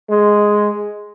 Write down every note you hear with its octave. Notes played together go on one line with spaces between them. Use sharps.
G#3